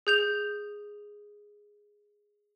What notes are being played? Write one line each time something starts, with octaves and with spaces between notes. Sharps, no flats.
G#4 G6 F7